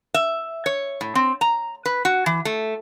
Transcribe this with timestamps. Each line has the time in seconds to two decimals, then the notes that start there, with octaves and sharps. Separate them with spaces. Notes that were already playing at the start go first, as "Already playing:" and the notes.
0.14 E5
0.66 C#5
1.01 A2
1.15 C4
1.41 A#5
1.86 B4
2.05 F#4
2.26 E3
2.45 A3